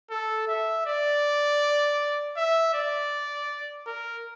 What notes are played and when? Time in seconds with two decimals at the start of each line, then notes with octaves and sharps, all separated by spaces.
0.10 A4
0.48 E5
0.86 D5
2.37 E5
2.74 D5
3.86 A#4